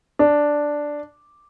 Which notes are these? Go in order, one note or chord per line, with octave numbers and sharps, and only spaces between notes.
D4